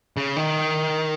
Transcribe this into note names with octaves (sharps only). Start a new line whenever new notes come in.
C#3
D#3